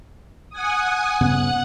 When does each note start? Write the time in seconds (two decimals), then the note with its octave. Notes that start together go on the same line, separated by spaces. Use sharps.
0.50 F#5 G#5 D#6
1.21 G2 C#3 B3 F#5 F#6